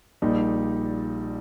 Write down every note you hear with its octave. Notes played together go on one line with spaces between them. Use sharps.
A#1 A#2 G3 D#4